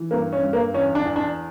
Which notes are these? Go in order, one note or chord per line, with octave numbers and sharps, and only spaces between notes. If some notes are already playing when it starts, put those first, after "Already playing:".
Already playing: E3
G2 A#3
C#4
G2
A#3
E2 C#4
D4
E2
D4